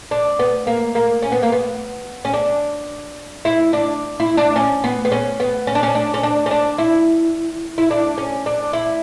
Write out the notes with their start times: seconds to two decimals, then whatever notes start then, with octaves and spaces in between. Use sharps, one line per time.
0.11 D4
0.39 B3
0.67 A#3
0.95 A#3
1.22 C#4
1.32 B3
1.43 A#3
1.52 B3
2.25 C#4
2.34 D4
3.45 E4
3.73 D4
4.20 E4
4.37 D4
4.56 C#4
4.84 B3
5.05 B3
5.12 C#4
5.40 B3
5.67 C#4
5.75 D4
5.83 C#4
5.95 D4
6.14 C#4
6.23 D4
6.46 C#4
6.51 D4
6.78 E4
7.78 E4
7.91 D4
8.18 C#4
8.46 D4
8.73 E4